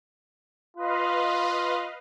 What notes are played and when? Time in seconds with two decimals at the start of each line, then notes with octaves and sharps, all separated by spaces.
0.77 F4 B4 D#5 F5